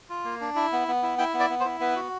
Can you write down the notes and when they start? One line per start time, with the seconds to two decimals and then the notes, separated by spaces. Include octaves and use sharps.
0.09 F4
0.24 A#3
0.41 D4
0.56 E4
0.72 B3
0.88 B3
1.03 E4
1.18 E4 G5
1.34 B3
1.40 D5
1.50 B3
1.60 C5
1.65 E4
1.80 B3 B4
1.96 F#4